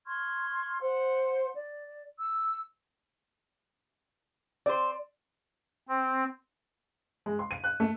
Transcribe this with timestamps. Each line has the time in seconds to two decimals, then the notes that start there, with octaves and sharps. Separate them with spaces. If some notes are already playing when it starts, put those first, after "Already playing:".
0.07 C6 C#6 F6 G#6
0.81 C5 F#5 C6
1.56 D5
2.19 E6
4.66 C4 C5 D5
5.89 C4
7.26 G#3
7.39 C6
7.51 D#7
7.64 F#6
7.80 A3